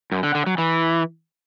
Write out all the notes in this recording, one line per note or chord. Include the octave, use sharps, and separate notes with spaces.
F#2
D3
D3
F#3
E3